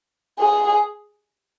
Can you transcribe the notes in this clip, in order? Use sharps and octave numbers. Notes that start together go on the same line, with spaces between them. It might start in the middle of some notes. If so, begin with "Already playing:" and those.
G#4